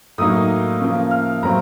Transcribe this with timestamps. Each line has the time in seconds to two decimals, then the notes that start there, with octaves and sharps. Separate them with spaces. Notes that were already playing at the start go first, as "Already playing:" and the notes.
0.18 A2 F#3 A#3 D#4 D#6
0.81 C#3 F3 A#3
1.11 F6
1.43 A2 F#3 C4 A#5